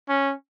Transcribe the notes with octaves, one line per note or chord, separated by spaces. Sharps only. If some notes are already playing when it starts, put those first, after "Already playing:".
C#4